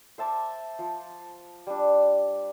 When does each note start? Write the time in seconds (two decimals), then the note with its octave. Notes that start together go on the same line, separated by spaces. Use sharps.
0.18 C5 E5 A5 D6
0.79 F3
1.67 G3 D4